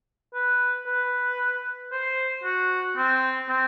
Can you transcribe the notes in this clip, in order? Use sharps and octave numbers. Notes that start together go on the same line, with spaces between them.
B4
B4
C5
F#4
C4
C4